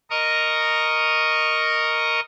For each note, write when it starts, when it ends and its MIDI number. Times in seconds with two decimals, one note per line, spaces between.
0.10 2.20 70
0.10 2.20 75
0.10 2.20 82
0.10 2.20 85
0.10 2.20 87